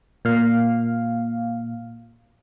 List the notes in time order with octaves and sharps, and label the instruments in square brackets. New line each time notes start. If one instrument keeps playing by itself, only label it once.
[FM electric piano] A#2 F5